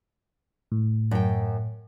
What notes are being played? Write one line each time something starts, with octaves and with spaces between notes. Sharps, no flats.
A2
F#2 G5